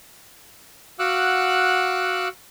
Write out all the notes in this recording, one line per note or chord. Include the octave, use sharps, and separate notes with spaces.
F#4 F5 F#5 D6 E6 F#6